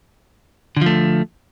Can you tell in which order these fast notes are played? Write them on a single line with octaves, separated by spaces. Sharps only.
D3 F3 A3